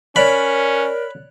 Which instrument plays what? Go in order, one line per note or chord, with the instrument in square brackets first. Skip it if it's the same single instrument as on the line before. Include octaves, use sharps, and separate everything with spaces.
[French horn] C#4 [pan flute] A#4 [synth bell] C#5 D5 F#6 [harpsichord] B5